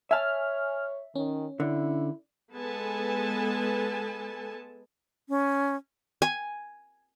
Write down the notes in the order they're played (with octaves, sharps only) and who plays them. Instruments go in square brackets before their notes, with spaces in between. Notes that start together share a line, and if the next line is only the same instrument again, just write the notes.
[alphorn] C#5 [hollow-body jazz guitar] E5 A5 [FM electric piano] G#5 F6
[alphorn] D#3 [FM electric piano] C#4
[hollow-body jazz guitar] D3 [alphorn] E4
[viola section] G#3 B3 A4 G#5 A5
[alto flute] C#4
[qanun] G#5